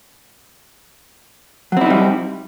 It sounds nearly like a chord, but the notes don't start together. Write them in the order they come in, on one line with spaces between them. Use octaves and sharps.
F#3 C4 E4 D#4 G3